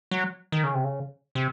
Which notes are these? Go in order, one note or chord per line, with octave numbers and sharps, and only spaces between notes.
F#3
D#3
C#3
C3
C#3
C3